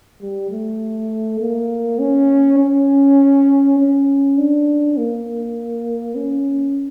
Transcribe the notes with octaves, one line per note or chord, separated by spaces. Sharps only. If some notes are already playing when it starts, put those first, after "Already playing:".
G3
A3
A#3
C#4
C#4
C#4
D4
A#3
C#4